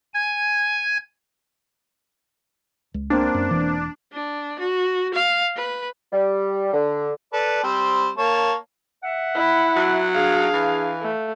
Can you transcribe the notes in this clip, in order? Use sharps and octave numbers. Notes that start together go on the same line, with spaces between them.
G#5 G#6
C#2
A#3 C4 D4
F#2
E1 E3
D4
F#4
F5
B4
G3
D3
A4 B4 D5
G3 C4 C5
A#3 C#5 A5
E5 F#5
E4
F#3
D4 G#4 F5
E3
A3